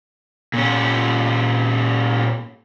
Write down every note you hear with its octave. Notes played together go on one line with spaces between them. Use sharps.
A#2 C#4